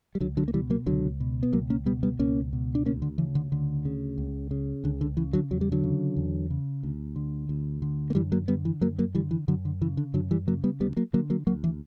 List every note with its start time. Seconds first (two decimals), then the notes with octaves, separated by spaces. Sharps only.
0.15 G3
0.20 C#2 D3 F#3
0.37 D3 F#3
0.48 A#3
0.53 B2 E3 G3
0.70 F#3 A#3
0.86 C#2 D3 F#3
1.20 B2
1.43 B3
1.53 C#2 F#3 A#3
1.70 A#3 C#4
1.86 B2 G3 B3
2.03 G3 B3
2.19 C#2 A#3 C#4
2.53 B2
2.75 D4
2.85 D2 A#3 C#4
3.02 D3
3.18 C#3 E3
3.35 D3
3.52 D2 D3
3.85 C#3
4.18 C#2
4.51 C#3
4.84 C#2 D3
5.01 D3
5.17 C#3 E3
5.33 D3 F#3
5.51 E2 F#3
5.61 G3
5.72 D3 F#3
5.84 C#3
6.16 E2
6.50 C#3
6.83 D2
7.16 D3
7.49 D2
7.82 D3
8.10 A#3
8.15 F#2 E3 G3
8.32 F#3 A#3
8.48 D3 G3 B3
8.65 E3
8.81 F#2 F#3 A#3
8.98 F#3 A#3
9.15 D3 E3 G3
9.31 E3
9.48 F#2 D3 F#3
9.65 D3
9.81 C#3 E3
9.97 D3
10.14 F#2 D3 F#3
10.31 E3 G3
10.47 C#3 F#3 A#3
10.64 G3 B3
10.80 D2 G3 B3
10.97 F#3 A#3
11.13 D3 F#3 A#3
11.30 F#3 A#3
11.47 D2 F#3 A#3
11.64 E3